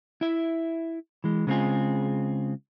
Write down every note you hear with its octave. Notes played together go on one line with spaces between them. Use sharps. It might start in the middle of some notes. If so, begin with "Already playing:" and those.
E4 E5
E3 G#3
C#3 G#3 B3 C4 F4 G#4